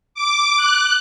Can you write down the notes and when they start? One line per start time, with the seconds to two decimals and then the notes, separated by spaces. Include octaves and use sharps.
0.15 D6
0.57 F#6